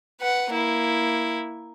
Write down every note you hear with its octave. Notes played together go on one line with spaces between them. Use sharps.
B4 F#5
A#3 E4